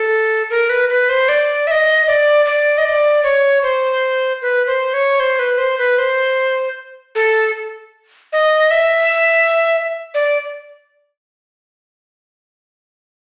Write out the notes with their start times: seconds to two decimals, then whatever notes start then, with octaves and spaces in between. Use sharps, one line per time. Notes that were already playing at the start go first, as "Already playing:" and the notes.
Already playing: A4
0.50 A#4
0.69 B4
0.89 B4
1.09 C5
1.28 D5
1.67 E5
1.71 D#5
2.07 D5
2.45 D5
2.78 D#5
2.85 D5
3.23 C#5
3.62 C5
4.42 B4
4.67 C5
4.93 C#5
5.20 C5
5.39 B4
5.58 C5
5.78 B4
5.98 C5
7.15 A4
8.32 D#5
8.71 E5
10.14 D5